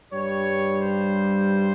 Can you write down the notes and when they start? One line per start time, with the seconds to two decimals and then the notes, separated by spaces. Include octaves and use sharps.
0.12 G2 G3 C#5
0.79 C5